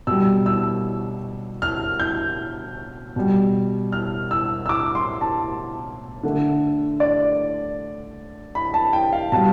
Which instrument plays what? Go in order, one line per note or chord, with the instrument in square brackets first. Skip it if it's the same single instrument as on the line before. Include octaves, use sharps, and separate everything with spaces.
[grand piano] B2 G3 E6
E6
F6
G6
B2 G3
F6
E6
E6
D6
C6
A5
D3 A3
D5
B5
A5
G5
F5
B2 G3 A5